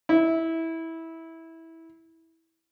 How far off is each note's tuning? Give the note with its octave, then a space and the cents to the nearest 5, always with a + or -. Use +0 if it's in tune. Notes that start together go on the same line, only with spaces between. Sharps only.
E4 -15